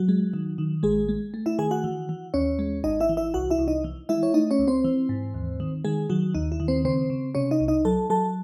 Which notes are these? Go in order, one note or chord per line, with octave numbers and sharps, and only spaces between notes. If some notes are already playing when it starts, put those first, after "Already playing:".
Already playing: F#3 F#4
G#3
D#3
D#3
A1 G#3 G#4
G#3
A3
E4 E5
D#3 G#4 G#5
F#4 F#5
E3
E3
D#2 C#4 C#5
G#3
G#1 D#4 D#5
E4 E5
E3
E4 E5
C2 F#4 F#5
E4 E5
C2
D#4 D#5
E3
G#3 E4 E5
C#5
A3 D#4 D#5
C#4 C#5
C#2
C4 C5
E3
G#2
D#2
D#3
D#3 G#3 G#4
D#3 F#3 F#4
D#2 D#4
E4
D#3
C4 C5
C#3 C4 C5
C#3
C3 C#4 C#5
D#4 D#5
C2
D#4 D#5
F#3 A4 A5
F#3 A4 A5